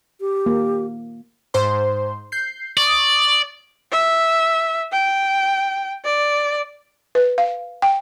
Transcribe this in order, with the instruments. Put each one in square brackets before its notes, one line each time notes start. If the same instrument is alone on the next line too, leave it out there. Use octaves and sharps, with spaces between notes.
[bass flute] G4
[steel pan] A#3
[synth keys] G#2 C5 C6
G6 C7
[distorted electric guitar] D5 [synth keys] C#6 D#6
[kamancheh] E5
G5
D5
[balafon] B4
F5
G5